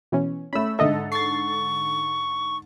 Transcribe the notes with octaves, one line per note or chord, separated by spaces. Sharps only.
B2 E3 C#4
A3 C#4 B5 E6
G#2 D3 A4 D#5 E5
C#6 A6 C7